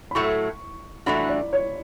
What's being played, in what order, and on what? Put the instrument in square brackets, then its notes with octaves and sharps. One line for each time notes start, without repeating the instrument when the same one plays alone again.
[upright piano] B5
[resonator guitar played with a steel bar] A2 F#3 A3 [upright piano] C#6
[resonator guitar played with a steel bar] E3 A3 D4 F#4 [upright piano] B5
[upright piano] D5
C#5